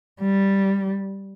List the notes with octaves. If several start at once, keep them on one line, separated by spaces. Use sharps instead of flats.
G3